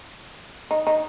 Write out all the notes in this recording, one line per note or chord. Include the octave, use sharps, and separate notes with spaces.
D#4
D#4